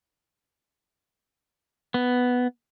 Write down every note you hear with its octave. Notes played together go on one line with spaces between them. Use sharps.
B3